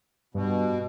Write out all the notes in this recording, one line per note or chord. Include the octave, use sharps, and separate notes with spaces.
G2 B2